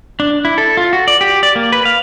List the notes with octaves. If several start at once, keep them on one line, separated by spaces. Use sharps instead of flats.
D4
E4
A4
F4
F#4
D5
G4
D5
A#3
B4
F5